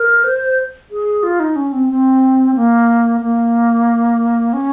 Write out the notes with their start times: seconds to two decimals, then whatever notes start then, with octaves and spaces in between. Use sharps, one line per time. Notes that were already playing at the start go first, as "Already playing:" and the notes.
Already playing: A#4
0.24 C5
0.91 G#4
1.23 F4
1.40 D#4
1.56 C#4
1.73 C4
1.90 C4
2.55 A#3
3.21 A#3
4.53 C#4